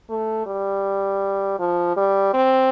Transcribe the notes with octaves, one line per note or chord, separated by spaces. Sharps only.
A3
G3
F3
G3
C4